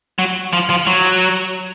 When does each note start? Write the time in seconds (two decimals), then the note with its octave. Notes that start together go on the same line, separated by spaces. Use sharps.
0.19 F#3
0.53 F3
0.70 F3
0.87 F#3